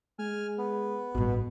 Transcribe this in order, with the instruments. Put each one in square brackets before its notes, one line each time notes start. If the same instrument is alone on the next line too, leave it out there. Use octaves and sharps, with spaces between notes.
[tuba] G#3 [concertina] G#5 F6
[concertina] B3
[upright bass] A1 G2 [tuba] B2